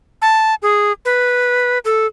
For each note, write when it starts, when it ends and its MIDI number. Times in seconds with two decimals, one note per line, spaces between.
0.22 0.55 81
0.62 0.92 68
1.05 1.78 71
1.85 2.07 69